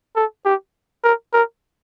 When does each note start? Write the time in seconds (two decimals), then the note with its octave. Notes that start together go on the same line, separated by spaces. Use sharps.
0.16 A4
0.45 G4
1.04 A#4
1.33 A#4